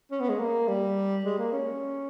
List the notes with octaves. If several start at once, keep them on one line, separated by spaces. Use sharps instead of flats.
C#4
B3
G#3
A#3
G3
G#3
A#3
C#4